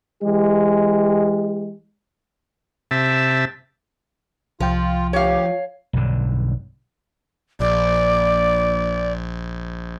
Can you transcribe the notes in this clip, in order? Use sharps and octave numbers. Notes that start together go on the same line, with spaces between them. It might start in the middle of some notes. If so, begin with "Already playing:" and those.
E3 G#3 G4
C3 E5 A5
C2 F3 F4 G5
D2 G4 C#5 F5
B1 G2 D3
A#1 D5